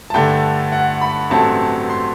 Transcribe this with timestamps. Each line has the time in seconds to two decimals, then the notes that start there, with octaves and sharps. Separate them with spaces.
0.10 A5
0.14 G2 D3 A3 G5
0.72 F#5
1.01 B5
1.30 A1 G2 F#3 A3 C4 A5
1.89 C6